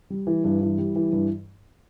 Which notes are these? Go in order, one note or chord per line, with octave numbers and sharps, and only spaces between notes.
G3
E3
G2
E3
G3
E3
G2